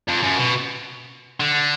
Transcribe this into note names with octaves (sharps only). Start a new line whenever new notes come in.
F2
F#2
B2
D3